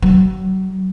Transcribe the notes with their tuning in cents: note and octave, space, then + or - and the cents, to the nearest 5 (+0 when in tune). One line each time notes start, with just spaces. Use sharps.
F#3 +35